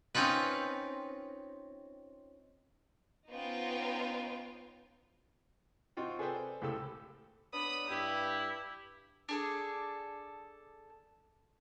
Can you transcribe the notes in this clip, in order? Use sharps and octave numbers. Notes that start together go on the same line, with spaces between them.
C4 C#4 D#4 F4 B4
B3 C#4 D#4 F4 C5 G5
C4 D#4 F4 F#4 G5
G#4 A4 B4 C5 D5 G5
C#2 A2 G4 A4 E6
F#3 B3 D4 B5 D#6
G2 E4 G4
D4 G#4 A4